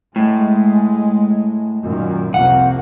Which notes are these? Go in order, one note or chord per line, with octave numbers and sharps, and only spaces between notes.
A2 G#3
F#2 A#2 D#3
C2 F2 A#3 F#5